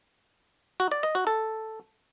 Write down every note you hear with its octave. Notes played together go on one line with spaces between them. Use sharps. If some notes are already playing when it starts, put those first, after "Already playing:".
F#4
D5
D#5
F#4
A4